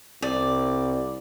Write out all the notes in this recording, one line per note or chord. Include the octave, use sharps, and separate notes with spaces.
C2 D5